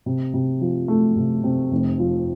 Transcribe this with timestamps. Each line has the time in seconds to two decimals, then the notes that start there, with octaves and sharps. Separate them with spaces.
0.06 C3
0.34 C3
0.61 F3
0.88 A3
1.16 C3
1.44 C3
1.72 F1
1.99 F3